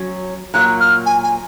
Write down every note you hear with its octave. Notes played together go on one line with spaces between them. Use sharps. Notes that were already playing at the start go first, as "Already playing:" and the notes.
Already playing: F#3 C#4
A#2 F#3 A#3 F#6
F6
G#5
G#5